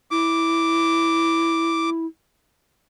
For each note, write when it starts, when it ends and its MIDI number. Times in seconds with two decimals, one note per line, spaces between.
0.11 2.06 64
0.11 1.90 86